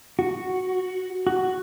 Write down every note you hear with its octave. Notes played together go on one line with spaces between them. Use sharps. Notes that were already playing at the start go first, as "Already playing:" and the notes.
F#4
F#4